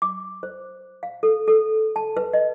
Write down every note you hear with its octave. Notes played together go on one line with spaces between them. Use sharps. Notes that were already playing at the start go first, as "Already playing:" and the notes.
D6
C5
F5
A4
A4
A5
B4
D#5